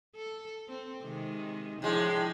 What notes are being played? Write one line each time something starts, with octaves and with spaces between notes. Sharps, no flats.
A4
C4
C3 D#3 G#3
A2 F3 G#3 D4 E4